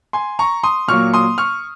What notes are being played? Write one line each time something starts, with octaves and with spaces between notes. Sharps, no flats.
G#5 C6
A#5 C#6
C6 D#6
A#2 F#3 A#3 C#6 F6
C6 D#6
C#6 F6